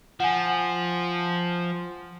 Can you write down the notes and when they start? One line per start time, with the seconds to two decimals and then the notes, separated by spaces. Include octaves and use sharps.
0.20 F3 F#5 G#5